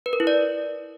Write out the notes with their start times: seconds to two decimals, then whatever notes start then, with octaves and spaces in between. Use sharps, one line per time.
0.06 B4
0.13 A#4
0.20 E4
0.27 D5